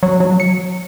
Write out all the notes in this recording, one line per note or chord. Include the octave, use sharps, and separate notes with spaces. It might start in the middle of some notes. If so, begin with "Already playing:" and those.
F#3
F#3
C#7